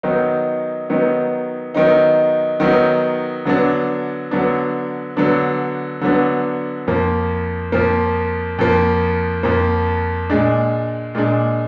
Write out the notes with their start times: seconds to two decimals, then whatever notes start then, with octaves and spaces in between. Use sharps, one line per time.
0.03 D#3 F#3 B3 D#4
0.90 D#3 F#3 B3 D#4
1.74 D#3 F#3 B3 D#4
2.60 D#3 F#3 B3 D#4
3.45 D3 F#3 B3 D4
4.31 D3 F#3 B3 D4
5.17 D3 F#3 B3 D4
6.01 D3 F#3 B3 D4
6.88 F2 F3 A#3
7.72 F2 F3 A#3
8.59 F2 F3 A#3
9.43 F2 F3 A#3
10.30 A#2 G#3 D4
11.15 A#2 G#3 D4